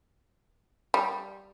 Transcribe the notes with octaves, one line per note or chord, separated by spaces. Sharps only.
G3